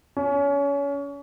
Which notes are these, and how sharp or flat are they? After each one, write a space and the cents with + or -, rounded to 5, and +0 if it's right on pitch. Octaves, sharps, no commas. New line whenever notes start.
C#4 +30